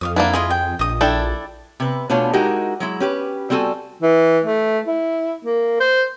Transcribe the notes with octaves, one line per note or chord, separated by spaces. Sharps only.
F2 F5 D6 D#6
A#3 D4 E4 F#5
E4 F4 G#4 D#5
G5
A#1 D#5 D#6
D4 E4 A4 G5
C3 B4
B2 A3 D4 F4 C#5 G#5
G#3 D#4 E4 F#4 G4 A#4
F#3 G#3 E4
C#4 G4 B4
G3 C4 F#4 A4 G#5
E3
A3
E4
A#3
C5